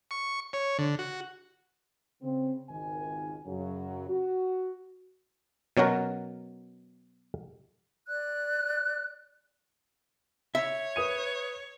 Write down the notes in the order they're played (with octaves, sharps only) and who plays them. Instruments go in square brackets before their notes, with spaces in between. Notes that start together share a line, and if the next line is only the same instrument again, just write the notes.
[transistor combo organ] C#6
C#5
D3
F#4
[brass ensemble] C#3 C4
G#1 C#2 D#3 G#5
F#2 C#3 F#3
F#4
[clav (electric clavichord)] B2 F#3 C#4 F#4 A#4
[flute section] D5 F#6
[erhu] C#5 [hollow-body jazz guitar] E5
[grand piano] B4 D#6 D#7